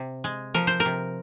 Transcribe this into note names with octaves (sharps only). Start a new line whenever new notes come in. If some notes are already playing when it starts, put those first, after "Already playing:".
Already playing: C3
G#3
F3 A#4
C5
A#4
C3